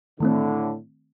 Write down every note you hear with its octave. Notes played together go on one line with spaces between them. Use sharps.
A2 D3 D#3 A3 C4